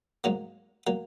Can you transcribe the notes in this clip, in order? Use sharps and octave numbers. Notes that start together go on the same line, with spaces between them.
G#2 F#3 A#3
F#3 A#3